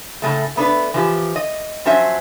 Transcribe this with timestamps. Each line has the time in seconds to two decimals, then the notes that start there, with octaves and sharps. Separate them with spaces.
0.22 A2 C#3 G#3 A3
0.56 A3 B3 D4 B4
0.94 E3 F3 G4
1.36 D#5
1.85 F3 F#3 C#4 C5 E5